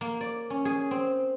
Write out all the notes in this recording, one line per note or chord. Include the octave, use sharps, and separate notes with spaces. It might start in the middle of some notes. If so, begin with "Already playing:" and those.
A#3
D5
C#4
G#4
C4